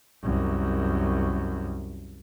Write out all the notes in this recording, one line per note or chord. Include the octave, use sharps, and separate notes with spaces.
C2 F#2